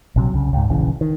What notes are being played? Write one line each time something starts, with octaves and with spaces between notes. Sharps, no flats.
A#1 C3 F#3
C2 C#3
C#2 G#2
E1 A#1 C#3 E3
D#3